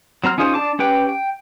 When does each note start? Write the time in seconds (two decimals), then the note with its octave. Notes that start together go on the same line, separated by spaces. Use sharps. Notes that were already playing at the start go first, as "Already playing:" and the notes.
0.24 F#3 C4 A#5 F6
0.38 C#4 D#4 F4 G#4 C5
0.54 D4 A5 D6
0.79 C#4 G4 B4 G5
1.09 G5